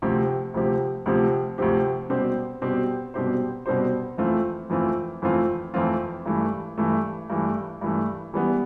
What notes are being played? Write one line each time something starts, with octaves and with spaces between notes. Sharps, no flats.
D2 C3 F3 C4 G4
D2 C3 F3 C4 G4
D2 C3 F3 C4 G4
D2 C3 F3 C4 G4
B2 G3 C4 G4 C5
B2 G3 C4 G4 C5
B2 G3 C4 G4 C5
B2 G3 C4 G4 C5
F2 E3 A3 C4 F4
F2 E3 A3 C4 F4
F2 E3 A3 C4 F4
F2 E3 A3 C4 F4
G2 E3 A3
G2 E3 A3
G2 E3 A3
G2 E3 A3
E3 G3 B3